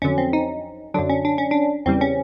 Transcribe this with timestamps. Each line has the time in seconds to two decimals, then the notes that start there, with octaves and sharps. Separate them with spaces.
0.02 F2 D3 F#3 C#4
0.18 C4
0.33 D#4
0.94 F#2 D3 F#3 D4
1.10 C#4
1.25 D4
1.38 C#4
1.51 D4
1.86 E2 C#3 E3 G3 C4
2.01 C#4